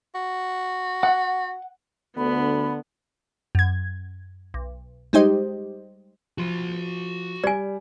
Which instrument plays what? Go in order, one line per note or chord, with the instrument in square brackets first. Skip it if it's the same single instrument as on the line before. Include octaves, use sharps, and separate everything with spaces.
[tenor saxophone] F#4
[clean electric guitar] F#5
[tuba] D2 [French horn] D3 [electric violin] B3 [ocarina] B5
[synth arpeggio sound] F#2 G#6
B1
G3 G#3 D#4 G4 C5 D#5
[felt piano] F3 [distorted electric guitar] F#4 C6
[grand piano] G3 [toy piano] D5 G#5